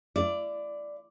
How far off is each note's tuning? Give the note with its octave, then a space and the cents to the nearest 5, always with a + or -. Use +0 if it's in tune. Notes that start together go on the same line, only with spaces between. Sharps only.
E4 +40 D5 +0